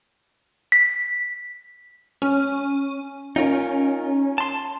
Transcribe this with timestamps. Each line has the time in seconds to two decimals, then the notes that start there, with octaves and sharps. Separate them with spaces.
0.72 B6
2.22 C#4
3.36 C#4 D#4 F4 A#4
4.38 A5 C6